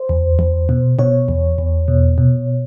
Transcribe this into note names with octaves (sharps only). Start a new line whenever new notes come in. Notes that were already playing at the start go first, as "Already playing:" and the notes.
Already playing: C5
E2
E2
B2
B2 C#5
E2
E2
B2
B2